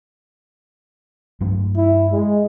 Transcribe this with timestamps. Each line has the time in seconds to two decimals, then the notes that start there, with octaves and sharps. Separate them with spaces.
1.41 G2 F#3 A3
1.76 E4
2.12 G#3